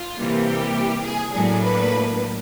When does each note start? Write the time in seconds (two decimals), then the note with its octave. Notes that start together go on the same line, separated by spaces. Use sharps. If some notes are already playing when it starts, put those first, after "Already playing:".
Already playing: F4
0.18 C3 E3 G3 A#3
0.46 G4
1.04 G#4
1.34 A2 F#3 A#3 D4 G#4
1.63 B4